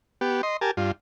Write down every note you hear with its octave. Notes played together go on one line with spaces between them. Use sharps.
B3 G4
D#5 C6
G4 A#4 G#5 A5
G2 F4